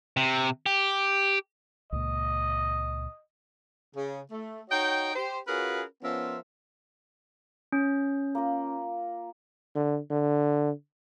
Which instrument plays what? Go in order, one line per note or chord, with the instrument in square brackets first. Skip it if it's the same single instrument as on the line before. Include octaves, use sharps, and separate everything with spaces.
[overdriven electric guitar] C3
G4
[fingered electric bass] C#2 A#2 [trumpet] D#5
[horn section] C#3
A3
D#4 F#4 C#5 D#5 G5
G4 C5
C#4 F4 F#4 G#4 A#4 B4
F3 B3 C#4 F4 A#4 E5
[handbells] C#4
[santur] A#3 F4 A#4
[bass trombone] D3
D3